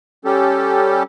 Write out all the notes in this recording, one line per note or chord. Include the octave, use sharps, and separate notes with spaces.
G3 C#4 G4 A4